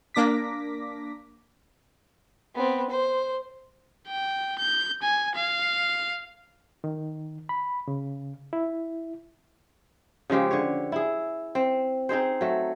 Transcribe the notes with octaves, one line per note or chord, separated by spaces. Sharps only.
A#3 D4 D6 A#6 B6
B3 C4
C5
G5
G6
G#5
F5
D#3
B5
C#3
E4
C#3 F3 G#3 G4
D3 C#5
E4 G#4
C4
C4 D#4 G#4 C5
F#3 A3